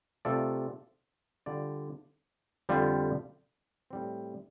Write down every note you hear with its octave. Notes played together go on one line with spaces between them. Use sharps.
C3 A3 F4 A4 D5
D3 G3 F4 D5
F2 D3 G3 F4
A2 G3 C4